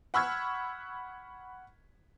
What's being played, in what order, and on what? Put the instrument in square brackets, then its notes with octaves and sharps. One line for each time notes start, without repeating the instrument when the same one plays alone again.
[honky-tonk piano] F#5 B5 C#6 E6 F6 G#6